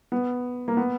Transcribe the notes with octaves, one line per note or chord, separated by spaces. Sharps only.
B3
A#3
B3